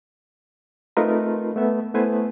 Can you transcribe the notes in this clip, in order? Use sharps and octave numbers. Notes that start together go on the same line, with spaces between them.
A3 C4 D#4 F4 A#4 B4
A3 B3 E5
A3 B3 E4 B4 C5 G#5